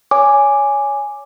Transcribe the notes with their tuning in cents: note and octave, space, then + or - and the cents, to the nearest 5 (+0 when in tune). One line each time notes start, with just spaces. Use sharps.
C#5 +20 G#5 +0 D6 +0